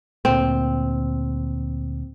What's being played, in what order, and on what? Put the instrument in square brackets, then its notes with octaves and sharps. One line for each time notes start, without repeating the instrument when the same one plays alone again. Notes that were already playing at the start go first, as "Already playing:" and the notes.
[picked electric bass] D2 A#2 [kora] C4